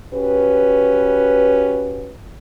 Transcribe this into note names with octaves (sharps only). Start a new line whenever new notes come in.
C#4 F#4 G4 B4